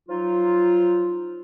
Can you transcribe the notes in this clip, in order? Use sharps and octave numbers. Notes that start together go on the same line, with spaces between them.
F3 F#3 D#4 F4